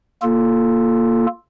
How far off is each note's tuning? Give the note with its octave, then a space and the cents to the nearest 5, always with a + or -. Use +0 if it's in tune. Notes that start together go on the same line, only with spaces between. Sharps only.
A#3 +0 F4 +0 A4 +0